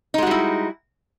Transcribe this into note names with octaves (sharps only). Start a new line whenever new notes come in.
G3 G#3 D#4 E4 F#4